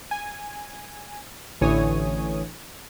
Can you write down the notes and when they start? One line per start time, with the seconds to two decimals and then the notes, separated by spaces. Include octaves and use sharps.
0.11 G#5
1.61 A1 D3 E3 C#5 G#5 D#6